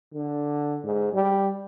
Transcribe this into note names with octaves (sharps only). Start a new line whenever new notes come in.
D3
G#2
G3